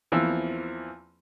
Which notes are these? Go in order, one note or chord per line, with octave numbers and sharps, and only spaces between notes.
E2 E3 F3 A#3 C4 E6